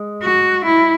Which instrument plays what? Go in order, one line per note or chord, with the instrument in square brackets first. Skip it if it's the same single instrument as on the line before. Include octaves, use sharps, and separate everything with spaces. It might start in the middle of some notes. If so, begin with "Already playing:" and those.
Already playing: [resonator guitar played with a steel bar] G#3
[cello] F#4
E4